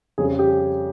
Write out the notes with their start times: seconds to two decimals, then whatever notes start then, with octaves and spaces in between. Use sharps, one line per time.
0.18 F2 C#3 G3 C#4 G#4
0.39 G4